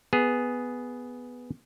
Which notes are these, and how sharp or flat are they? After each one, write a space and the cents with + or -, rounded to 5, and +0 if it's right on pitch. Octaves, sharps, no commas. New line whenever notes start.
B3 +0 G#4 +0